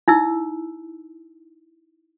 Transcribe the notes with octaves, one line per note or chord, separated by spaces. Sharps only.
D#4 E4 E6